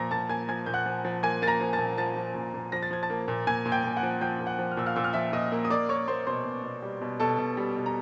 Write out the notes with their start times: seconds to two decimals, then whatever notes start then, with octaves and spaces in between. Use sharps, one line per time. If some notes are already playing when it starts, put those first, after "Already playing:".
Already playing: A#2 F3 A#5 A#6
0.11 A#2 A5 A6
0.29 A#3 G#5 G#6
0.49 F3 G#5 G#6
0.66 A#2 G6
0.74 F#5 F#6
0.86 F3
1.05 F3
1.23 A#3 G#5 G#6
1.42 A#3 A6
1.47 A#5 A#6
1.61 F3
1.73 A5 A6
1.79 A#2
1.98 F3 A5 A6
2.16 F3
2.35 A#2
2.54 A#2
2.72 F3 A#6
2.83 A6
2.91 F3 G#6
3.03 A5 A6
3.10 A#3
3.28 A#2
3.47 A#2 G#5 G#6
3.66 A#2
3.72 G5 G6
3.84 A#2
3.97 F#5 F#6
4.03 F3
4.21 F3 G5 G6
4.40 A#2
4.46 F#5 F#6
4.59 F3
4.72 F6
4.77 A#2 E6
4.86 F5 F6
4.96 A#2 E6
5.04 F6
5.13 F3 E5 E6
5.33 A#2 D#5 D#6
5.52 A#3
5.65 D#6
5.70 A#3 D5 D6
5.89 A#3 C#5 C#6
6.08 A#3 C5 C6
6.27 B2 C5 C6
6.45 B2
6.64 B2
6.82 G3
7.01 B2
7.20 B2 A4 A5
7.38 B2
7.57 G3
7.76 B2
7.86 A#5